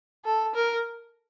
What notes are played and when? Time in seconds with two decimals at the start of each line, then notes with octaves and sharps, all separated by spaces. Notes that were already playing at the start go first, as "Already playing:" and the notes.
0.25 A4
0.54 A#4